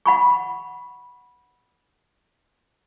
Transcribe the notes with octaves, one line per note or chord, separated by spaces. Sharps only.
F#5 B5 C#6